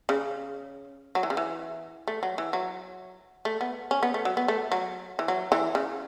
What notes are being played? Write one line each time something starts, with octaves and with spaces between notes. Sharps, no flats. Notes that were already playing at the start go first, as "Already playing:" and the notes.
C#3
F#3
E3
C#3
E3
A3
F#3
E3
F#3
A3
B3
C#4
B3
A3
F#3
B3
A3
F#3
E3
F#3
E3
C#3